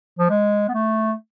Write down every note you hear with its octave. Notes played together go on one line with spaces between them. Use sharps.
F3
G#3
B3
A3